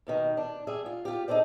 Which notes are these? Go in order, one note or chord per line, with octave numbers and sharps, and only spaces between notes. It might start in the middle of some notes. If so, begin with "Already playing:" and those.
D#2 B2 D#3
D4
G3 G#4 E5
F4
F4 G4
D#4 G#4 A4 C5 D5